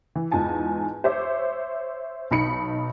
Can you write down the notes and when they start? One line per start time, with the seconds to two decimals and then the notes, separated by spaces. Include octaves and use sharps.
0.15 E3
0.31 E2 G#2 F4 G#5 A5
1.04 C5 C#5 E5 D6
2.31 B1 D#4 B5 C#7